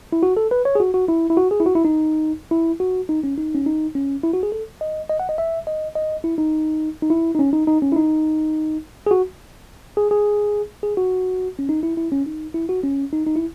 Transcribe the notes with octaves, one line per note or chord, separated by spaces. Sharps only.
E4
F#4
A4
B4
C#5
G#4
F#4
F#4
E4
E4
F#4
G#4
E4
F#4
E4
D#4
E4
F#4
D#4
C#4
D#4
C#4
D#4
C#4
E4
F#4
G#4
A4
D#5
D#5
F#5
D#5
E5
D#5
D#5
E4
D#4
D#4
E4
D#4
C#4
D#4
D#4
C#4
E4
D#4
G#4
F#4
G#4
G#4
G#4
F#4
C#4
D#4
E4
E4
C#4
D#4
E4
F#4
C#4
D#4
D#4
E4